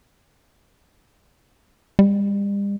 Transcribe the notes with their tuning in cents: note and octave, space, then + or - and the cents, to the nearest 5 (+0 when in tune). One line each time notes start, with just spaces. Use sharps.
G3 +40